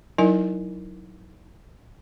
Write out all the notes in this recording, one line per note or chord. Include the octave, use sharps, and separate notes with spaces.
F#3 D#4 E4 A#4 D5 G#5